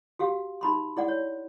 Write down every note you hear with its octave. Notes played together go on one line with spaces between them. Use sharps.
F#4 G4 F5
D#4 B5 C6
E4 D5 F#5
C#5